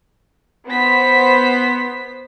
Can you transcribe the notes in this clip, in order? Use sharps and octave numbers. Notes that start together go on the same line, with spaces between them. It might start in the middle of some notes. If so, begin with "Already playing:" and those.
B3 C5 B6